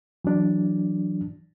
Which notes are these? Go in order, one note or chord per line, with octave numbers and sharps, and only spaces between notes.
E3 F#3 D4